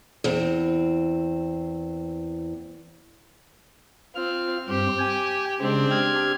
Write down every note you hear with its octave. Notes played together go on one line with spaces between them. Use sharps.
E2 C4
C4 F4 F6
G2 C4 G4 C5
G5 G#5
C#3 G#3 C4 D4
G4 F6 G#6